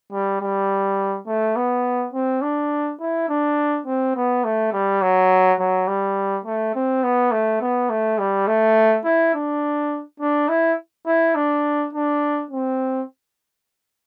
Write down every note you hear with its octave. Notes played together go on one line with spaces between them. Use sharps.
G3
G3
A3
B3
C4
D4
E4
D4
C4
B3
A3
G3
F#3
F#3
G3
A3
C4
B3
A3
B3
A3
G3
A3
E4
D4
D4
E4
E4
D4
D4
C4